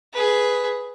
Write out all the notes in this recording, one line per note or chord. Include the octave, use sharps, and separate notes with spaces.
G#4 B4